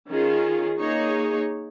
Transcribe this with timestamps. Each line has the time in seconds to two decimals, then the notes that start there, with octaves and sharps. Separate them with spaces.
0.08 D#3 C#4 F4 G#4
0.79 A#3 D#4 G#4 C#5